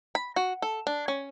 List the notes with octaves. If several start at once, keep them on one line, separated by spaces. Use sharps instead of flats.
B5
F#4
A4
D4
C#4